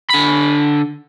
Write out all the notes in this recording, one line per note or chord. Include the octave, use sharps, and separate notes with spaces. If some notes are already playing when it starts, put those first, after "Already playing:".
D3 B5